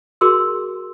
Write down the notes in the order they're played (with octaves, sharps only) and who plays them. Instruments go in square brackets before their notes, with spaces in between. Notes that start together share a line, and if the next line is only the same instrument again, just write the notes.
[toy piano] F#4 G#4 A#4 C6 E6